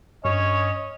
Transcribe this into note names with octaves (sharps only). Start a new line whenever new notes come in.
G2 C#4 C#5 D#5